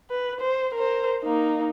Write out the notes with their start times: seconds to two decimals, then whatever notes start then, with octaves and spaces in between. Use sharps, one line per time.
0.10 B4
0.41 C5
0.75 A#4 C5
1.23 A#3 D#4